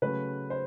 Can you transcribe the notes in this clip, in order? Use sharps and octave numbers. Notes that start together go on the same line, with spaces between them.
C#3 F#3 A3 B4
C5